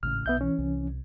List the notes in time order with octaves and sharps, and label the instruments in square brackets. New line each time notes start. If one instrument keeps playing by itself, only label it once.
[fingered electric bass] G#1 A2 C#3 [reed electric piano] F6
[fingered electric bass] B1 [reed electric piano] B3 E5 G6
[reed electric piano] E3 C#4
[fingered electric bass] C2